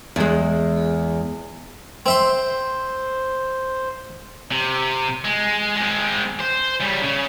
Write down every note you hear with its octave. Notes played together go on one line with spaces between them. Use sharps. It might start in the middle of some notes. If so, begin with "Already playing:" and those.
E2 G#3
C4 C5 E5 C6
C3
G#3
G#3 C4
C5
C#3 G3
C#3